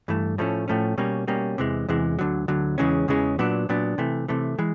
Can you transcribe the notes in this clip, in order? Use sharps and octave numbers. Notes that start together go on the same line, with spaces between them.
G2 E3 A3
A2 F3 A3 C#4
A2 F3 A3 C#4
B2 G3 A#3 C#4
B2 G3 A#3 C#4
E2 C3 E3 G#3
E2 C3 E3 G#3
D2 D3 F#3
D2 D3 F#3
E2 C#3 E3 G#3 C#4
E2 C#3 E3 G#3 C#4
A#2 F#3 B3 D4
A#2 F#3 B3 D4
C3 E3 A3
C3 E3 A3
E3 G#3